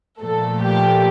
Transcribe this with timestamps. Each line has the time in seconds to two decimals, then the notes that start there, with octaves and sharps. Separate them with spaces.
0.21 A#2 F3 A3 A4
0.63 G4